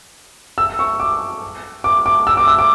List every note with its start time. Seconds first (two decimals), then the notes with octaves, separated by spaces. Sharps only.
0.58 E6
0.79 C#6
1.00 D6
1.84 D6
2.06 D6
2.27 E6
2.37 D6
2.48 E6
2.59 D6